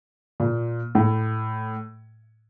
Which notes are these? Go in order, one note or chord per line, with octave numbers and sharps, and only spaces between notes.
A#2
A2